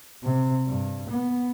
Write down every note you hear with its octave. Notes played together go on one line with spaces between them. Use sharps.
C3
G2
B3